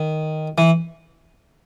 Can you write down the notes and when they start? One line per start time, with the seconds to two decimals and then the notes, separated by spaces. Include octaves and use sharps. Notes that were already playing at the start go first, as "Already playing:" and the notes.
Already playing: D#3
0.58 E3